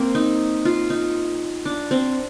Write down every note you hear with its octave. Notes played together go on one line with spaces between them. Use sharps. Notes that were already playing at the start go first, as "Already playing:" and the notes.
Already playing: A#3 C4
D#4
F4
D#4
D4
C4